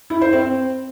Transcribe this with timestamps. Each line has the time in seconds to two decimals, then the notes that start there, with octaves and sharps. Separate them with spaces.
0.10 E4
0.21 C5
0.33 C4